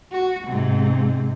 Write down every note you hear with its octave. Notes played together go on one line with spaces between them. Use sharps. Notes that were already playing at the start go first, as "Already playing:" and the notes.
F#4
G#2 C3